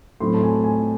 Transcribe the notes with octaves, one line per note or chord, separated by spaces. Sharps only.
A2 F#3 A3 C4 C6
A5
G#5
G#5